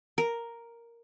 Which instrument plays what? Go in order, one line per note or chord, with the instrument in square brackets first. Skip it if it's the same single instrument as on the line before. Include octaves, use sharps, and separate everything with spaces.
[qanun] A#4